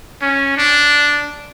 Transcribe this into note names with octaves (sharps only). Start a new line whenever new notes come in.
C#4
D4